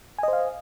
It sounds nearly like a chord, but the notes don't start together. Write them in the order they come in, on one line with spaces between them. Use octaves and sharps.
G#5 D#5 C5 F5